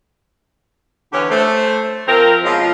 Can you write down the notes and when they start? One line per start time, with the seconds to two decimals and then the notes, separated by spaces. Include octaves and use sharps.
1.13 D3 E3 B3 C#4 G4 C#5
1.31 A3 A4 C5
2.07 F3 C4 A#4
2.44 B2 F3 G#3 C#4 F4